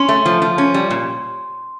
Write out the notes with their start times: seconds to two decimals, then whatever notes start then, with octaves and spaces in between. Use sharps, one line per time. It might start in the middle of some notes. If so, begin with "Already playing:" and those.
Already playing: C#4 C6
0.09 A3
0.26 F3
0.42 F3
0.58 C#4
0.74 G3
0.90 A#2